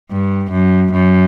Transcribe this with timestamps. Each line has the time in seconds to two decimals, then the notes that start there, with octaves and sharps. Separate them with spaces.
0.11 G2
0.52 F#2
0.92 F#2